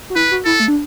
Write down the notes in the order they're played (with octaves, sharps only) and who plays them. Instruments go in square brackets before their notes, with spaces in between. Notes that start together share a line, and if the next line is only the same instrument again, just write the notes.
[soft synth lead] F#4
[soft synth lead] E4 [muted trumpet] B4
[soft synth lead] F#4
[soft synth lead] E4 [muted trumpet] A4
[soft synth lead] A3
D4